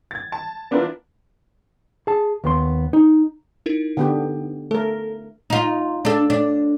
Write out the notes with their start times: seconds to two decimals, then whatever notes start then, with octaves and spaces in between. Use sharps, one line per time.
0.11 G#6 A6
0.32 A5
0.71 B3 D4 E4 F4 A#4 B4
2.07 G#4 A5
2.44 D#2 B3 C6
2.93 D#4
3.66 D#4 E4 A#4
3.97 D3 B3 G4
4.71 A3 A4 A#4
5.50 D#4 F4
6.05 D4 A4
6.30 D4